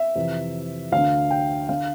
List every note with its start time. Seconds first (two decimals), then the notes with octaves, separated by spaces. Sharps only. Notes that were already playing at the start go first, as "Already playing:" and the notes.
Already playing: E5
0.15 F2 C3 E3
0.92 D2 D3 F5
1.30 G5
1.69 D3 F5